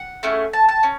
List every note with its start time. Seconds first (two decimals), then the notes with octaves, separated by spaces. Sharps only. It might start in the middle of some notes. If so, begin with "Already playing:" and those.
Already playing: F#5
0.23 A3 C#4 E4 G#4
0.53 A5
0.69 A5
0.83 C#4